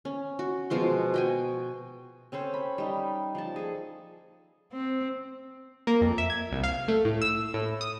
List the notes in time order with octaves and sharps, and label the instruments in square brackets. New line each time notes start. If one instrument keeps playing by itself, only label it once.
[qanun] C#4
F#4
B2 F3 G#3 C6
F#4 G5 G#5
C4 C#4 A4 C5
B5
G3 D#4
F3 A5
G#4 A4
[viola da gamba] C4
[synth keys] A#3
F2
E5
G#6
C2
F5
A3
A2
E6
A2
D#6